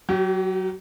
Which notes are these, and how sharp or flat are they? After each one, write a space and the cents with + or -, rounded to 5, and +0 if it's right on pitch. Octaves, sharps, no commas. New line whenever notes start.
F#3 +15 G4 -35